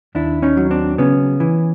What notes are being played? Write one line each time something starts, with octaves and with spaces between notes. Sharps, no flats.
D#2 D4 E4
C#4 D#4
F#3
C4 D4
C#3 B3 C#4
E3